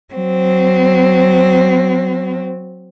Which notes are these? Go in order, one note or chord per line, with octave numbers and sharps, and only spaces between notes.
F#3 C4